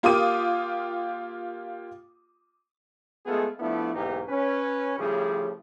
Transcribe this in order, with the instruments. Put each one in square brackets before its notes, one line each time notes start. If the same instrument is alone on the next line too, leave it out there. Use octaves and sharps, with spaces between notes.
[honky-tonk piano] A#3 F4 G4 D6 D#6 D#7
[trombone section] G#3 A3 B3 F4 G#4 A4
F3 A3 B3 D4 E4
B1 G#2 E3 A#3 D#4 G4
C#4 B4
A2 C#3 F3 G3 G4 G#4